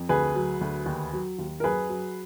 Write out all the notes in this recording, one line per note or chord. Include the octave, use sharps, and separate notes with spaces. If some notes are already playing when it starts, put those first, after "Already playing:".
Already playing: F2
D2 G#4 B4
F#3
D2
D#2
F#3
D#2
A#4
F#2 G#4 B4
F#3